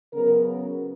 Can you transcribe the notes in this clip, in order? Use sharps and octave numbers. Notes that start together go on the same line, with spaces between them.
C#3 F#3 B3 A#4